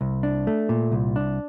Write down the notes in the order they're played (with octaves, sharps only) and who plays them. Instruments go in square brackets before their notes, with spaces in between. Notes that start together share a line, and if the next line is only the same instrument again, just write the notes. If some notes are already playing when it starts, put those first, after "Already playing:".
[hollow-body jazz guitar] C2
D4
A3
A#2
C2
D4